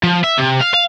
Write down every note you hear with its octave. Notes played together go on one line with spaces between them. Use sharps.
F3
E5
C3
F5
F5